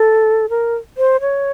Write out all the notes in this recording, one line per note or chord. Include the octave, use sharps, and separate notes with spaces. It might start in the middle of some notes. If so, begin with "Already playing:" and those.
Already playing: A4
A#4
C5
C#5